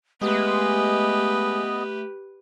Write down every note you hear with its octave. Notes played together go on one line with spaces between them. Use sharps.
G#3 A3 B3 G4 B4 D#5